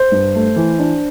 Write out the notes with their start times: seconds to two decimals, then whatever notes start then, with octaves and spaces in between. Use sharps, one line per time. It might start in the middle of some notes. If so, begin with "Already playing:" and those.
Already playing: C5
0.12 G2
0.35 A3
0.56 E3
0.79 D4